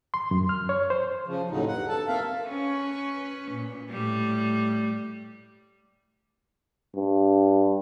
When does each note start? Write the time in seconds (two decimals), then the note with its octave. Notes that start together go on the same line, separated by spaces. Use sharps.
0.14 C6
0.31 F#2
0.49 F6
0.69 C#5
0.90 C5
1.27 C#3 F3
1.50 D#2 A2 C#3 F#3 D#4
1.68 G2 F#5
1.88 A4 A5
2.08 A#3 C4 A4 E5 F5
2.48 C#4 B4
3.51 A#2
3.90 A2 G3
6.95 G2